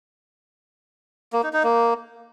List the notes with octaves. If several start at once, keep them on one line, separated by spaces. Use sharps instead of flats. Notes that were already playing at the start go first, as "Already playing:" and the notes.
A#3
D#4
D#4
A#3